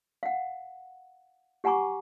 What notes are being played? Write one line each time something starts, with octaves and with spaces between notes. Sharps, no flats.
F5 F#5
G4 F#5 G#5 A#5 C#6 D6